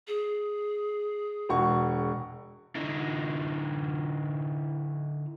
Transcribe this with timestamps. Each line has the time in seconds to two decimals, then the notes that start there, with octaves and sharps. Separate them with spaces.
0.07 G#4
1.49 E1 F#4 C#6
2.75 D3 D#4 E4